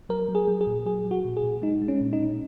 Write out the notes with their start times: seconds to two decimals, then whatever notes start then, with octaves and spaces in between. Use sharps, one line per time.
0.09 F#3 A#4
0.29 F#3
0.35 G#4
0.48 F#3
0.61 G#4
0.67 A#2
0.86 F#3 G#4
1.05 F#3
1.11 F#4
1.25 A#2
1.37 G#4
1.43 A#2
1.62 G#3 D#4
1.82 G#3
1.88 C#4
2.01 A#2
2.13 D#4
2.20 A#2